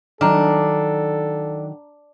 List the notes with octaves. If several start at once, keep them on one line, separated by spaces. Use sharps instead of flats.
D#3 F#3 D4 A4 A#5 F6